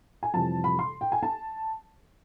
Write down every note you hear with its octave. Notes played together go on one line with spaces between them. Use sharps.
G#5
F2 C3 E3 G3 A5
B5
C6
G5
G#5
A5